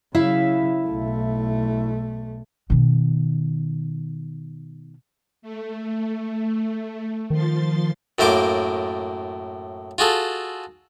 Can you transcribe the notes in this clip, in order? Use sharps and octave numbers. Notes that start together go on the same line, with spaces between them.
C#3 F#3 E4 E5 F5
B1 A3
B2 D#3
A3
D#3 F3 C6 A6
F#2 A2 A#3 C5 D6
F4 F#4 G#4 A4